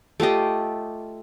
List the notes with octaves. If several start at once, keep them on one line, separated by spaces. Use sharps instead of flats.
A3 F4 G4 D#5